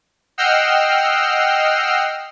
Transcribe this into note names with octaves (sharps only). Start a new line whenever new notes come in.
D#5 F#5 G5 E6 F6 C7